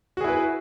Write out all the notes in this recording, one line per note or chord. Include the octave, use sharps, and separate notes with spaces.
E4 F#4 G#4 B4